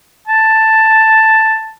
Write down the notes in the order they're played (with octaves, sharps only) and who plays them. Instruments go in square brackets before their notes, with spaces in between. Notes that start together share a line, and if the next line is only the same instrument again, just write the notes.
[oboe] A5